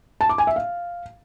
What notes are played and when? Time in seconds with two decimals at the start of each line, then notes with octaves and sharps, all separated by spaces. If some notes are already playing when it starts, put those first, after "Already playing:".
0.21 A5
0.29 D6
0.38 G#5
0.47 E5
0.56 F5